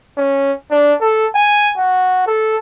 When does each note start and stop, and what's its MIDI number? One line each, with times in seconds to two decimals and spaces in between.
0.17 0.52 61
0.71 0.94 62
1.01 1.26 69
1.35 1.70 80
1.78 2.26 66
2.26 2.56 69